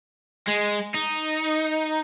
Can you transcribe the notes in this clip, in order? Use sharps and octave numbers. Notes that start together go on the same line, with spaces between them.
G#3
D#4